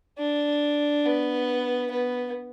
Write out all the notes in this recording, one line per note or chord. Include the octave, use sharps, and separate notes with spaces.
D4
B3
B3